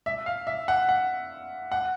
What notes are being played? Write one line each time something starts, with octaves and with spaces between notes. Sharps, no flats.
E5
F5
E5
F#5
F#5
F#5